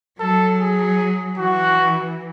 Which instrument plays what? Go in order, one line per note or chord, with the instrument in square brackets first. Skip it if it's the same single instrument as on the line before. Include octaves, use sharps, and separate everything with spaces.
[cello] F#3 [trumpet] A4
[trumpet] G#4
[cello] E3 [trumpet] F#4